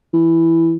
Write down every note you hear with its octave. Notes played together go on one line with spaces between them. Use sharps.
E3